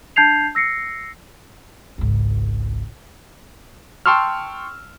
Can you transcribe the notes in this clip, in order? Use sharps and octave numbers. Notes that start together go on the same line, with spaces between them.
D4 A5 G6 G#6 C7 F7
E6 A#6 C7 C#7
G#1 C#2
G5 A5 C6 C#6 E6 F6